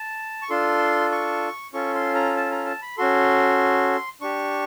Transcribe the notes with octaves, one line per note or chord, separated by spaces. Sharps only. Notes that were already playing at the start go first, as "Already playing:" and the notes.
Already playing: A5
C#6
D4 F4 A4 C6
C#6
C#4 F4 A4 C#6
C6
A#5
A5
A#5
A5
B5
C#4 F#4 A4 C6
D4 G4 C#6